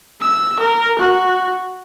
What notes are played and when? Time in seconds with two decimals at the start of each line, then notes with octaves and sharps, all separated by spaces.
0.21 E6
0.59 A#4
0.99 F#4